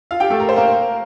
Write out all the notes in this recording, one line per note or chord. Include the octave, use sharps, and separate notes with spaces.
F4 F5
G4 G5
A3 A4
A#4
C5
A#3 A#4